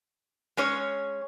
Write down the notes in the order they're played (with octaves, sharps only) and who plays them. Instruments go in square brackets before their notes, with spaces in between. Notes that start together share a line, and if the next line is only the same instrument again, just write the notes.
[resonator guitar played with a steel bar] G#3 C#4 C#5